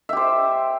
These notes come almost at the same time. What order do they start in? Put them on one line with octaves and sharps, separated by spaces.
E5 G4 C5